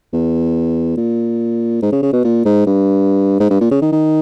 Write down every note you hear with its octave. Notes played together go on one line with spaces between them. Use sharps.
E2
A#2
G#2
C#3
C#3
B2
A#2
G#2
G2
G#2
G2
A#2
C#3
D#3
D#3